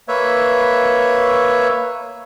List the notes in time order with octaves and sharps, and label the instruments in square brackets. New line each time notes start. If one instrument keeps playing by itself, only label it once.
[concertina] A#3 B4 C#5 E5